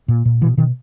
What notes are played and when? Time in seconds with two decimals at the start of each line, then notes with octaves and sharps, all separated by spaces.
0.08 A#2
0.25 A#2
0.41 B2 E3
0.57 B2 D#3